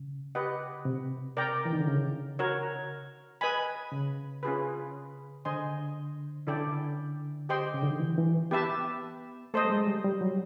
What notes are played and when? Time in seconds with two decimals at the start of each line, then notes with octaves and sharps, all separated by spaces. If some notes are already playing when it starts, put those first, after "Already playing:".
Already playing: C#3
0.35 G4 B4 D#5 F#5
0.85 C3
1.37 A#4 D5 G5 A#5
1.65 E3
1.73 D#3
1.80 D3
1.87 C#3
2.39 F#4 A#4 C#5
3.41 B4 D#5 G#5 B5
3.92 C#3
4.43 C#4 F4 G#4 B4
5.45 D3 C5 D#5 G#5 C6
6.47 D3 C#4 E4 A4 D5 G5
7.49 G4 C5 D#5 G5 C6
7.74 C#3
7.83 D3
7.91 D#3
8.00 E3
8.18 E3
8.51 B3 G4 B4 E5 A5
9.54 A3 A4 C5 D#5
9.65 G3
9.70 G#3
9.87 G3
10.05 G3
10.21 F#3